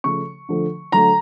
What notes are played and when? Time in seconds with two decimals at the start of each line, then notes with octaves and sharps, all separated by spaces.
0.04 C#3 F3 A3 C#6
0.49 D3 F3 A3
0.92 D3 F#3 A3 A#5